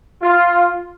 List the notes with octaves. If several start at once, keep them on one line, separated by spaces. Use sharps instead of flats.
F4